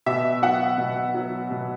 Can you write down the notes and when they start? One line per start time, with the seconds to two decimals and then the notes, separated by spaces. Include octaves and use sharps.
0.06 B2 E5
0.42 F#3 F#5
0.78 B2
1.14 F#3
1.51 B2